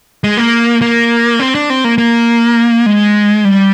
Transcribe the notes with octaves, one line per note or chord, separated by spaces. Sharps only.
G#3
A#3
A#3
C4
D4
C4
A#3
A#3
G#3
G3